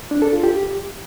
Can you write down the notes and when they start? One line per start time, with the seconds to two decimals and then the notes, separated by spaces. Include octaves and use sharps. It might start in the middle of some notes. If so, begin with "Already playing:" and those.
0.11 D4
0.22 A4
0.33 F4
0.43 G4